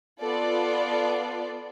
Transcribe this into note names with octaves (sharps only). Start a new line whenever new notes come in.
B3 F4 A4 D5